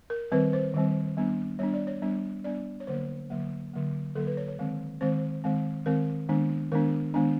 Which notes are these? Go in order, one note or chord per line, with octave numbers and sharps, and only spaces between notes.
A#4
D#3 G3 C4 B4
C5
D#3 G3 C4
G3 B3 D4
G3 B3 D4 C#5
D5
C#5
G3 B3 D4
G3 B3 D4 D5
C#5
D3 F#3 A#3 C5
D3 F#3 A#3
D3 F#3 A#3
D3 F#3 A#3 A4
B4
C#5
C#5
D#3 G#3 C4
D#3 G#3 C4 C5
D#3 G#3 C4
D#3 G#3 C4 A#4
D#3 G#3 B3 D4
D#3 G#3 B3 D4 A#4
D#3 G#3 B3 D4